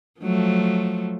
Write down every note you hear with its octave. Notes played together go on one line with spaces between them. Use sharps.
F3 F#3 A3